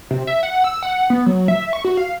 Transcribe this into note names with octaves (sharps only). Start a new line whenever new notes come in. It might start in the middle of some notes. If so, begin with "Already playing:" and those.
C3
E5
F#5
E6
F#5
B3
F#3
E5
C#6
F#4
F5